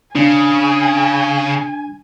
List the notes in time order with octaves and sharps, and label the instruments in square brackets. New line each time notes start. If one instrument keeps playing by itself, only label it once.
[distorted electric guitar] C#3 [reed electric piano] D4 [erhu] G#5